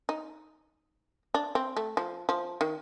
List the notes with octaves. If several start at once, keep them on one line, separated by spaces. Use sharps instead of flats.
D#4
D4
C4
A3
F3
F3
D#3